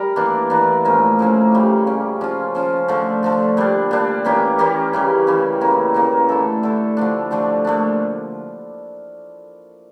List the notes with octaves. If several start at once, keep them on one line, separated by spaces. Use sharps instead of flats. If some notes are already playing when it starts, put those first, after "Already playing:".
Already playing: G3 A#4
E3 A#3 D4
E3 A#3 D4
A2 F3 A#3 C#4
A2 F3 A#3 C#4
C#3 G3 C#4
C#3 G3 C#4
F3 C#4 F4
F3 C#4 F4
D3 F3 A3
D3 F3 A3
A#2 G3 D4
A#2 G3 D4
E3 A#3 C#4 G4
E3 A#3 C#4 G4
C#3 E3 G3
C#3 E3 G3
C#3 E3 A#3
C#3 E3 A#3
D3 A3 E4 A4
D3 A3 E4 A4
D3 F3 A3 D4
D3 F3 A3 D4
A#2 A3 D4